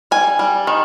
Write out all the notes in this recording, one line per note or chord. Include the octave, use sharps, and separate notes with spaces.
G3 G#5
G3
D#3